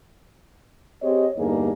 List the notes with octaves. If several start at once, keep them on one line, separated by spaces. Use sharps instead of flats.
C4 G4 G#4 C#5 D#5
E2 G2 D3 A#3 D#4 G#4